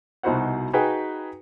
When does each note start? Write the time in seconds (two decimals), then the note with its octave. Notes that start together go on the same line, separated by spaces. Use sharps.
0.23 C2 B2 D#4 F#4 C5 F#5
0.73 D#4 F#4 G#4 B4 G5 G#5